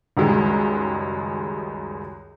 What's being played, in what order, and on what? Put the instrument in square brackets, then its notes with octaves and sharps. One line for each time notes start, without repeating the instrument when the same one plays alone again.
[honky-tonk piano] C#2 F#2 D#3 G3 G#3